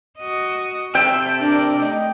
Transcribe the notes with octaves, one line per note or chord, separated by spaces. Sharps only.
F#4 D#5
C3 A4 E5 G5
D4 A#4 D5
A3 D#5